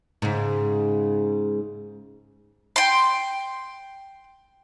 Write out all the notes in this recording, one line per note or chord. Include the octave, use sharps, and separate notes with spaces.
G#2 C#3
G5 C6